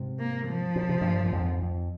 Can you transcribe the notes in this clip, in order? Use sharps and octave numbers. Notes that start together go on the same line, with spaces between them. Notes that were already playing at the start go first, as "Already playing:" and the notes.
Already playing: G#2 C3
A#3
F3
A#2
C3
G2 A#2
A#2
F2 G#2
F2